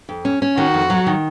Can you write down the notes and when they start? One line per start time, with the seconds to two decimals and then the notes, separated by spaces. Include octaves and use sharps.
0.09 F2
0.25 C#4
0.42 C#4
0.57 D#3 F#4
0.74 F2
0.90 F#3
1.07 D#3